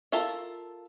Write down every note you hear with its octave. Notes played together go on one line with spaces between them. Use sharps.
F4 A4 A#4 E5